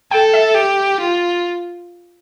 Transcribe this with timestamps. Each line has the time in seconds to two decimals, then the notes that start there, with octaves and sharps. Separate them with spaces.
0.11 A4 G5
0.34 E5
0.55 G4
1.00 F4